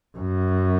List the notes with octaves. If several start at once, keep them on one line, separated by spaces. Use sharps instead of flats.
F#2